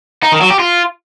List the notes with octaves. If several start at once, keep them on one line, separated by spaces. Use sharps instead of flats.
D#4
D#3
F#3
G4
F4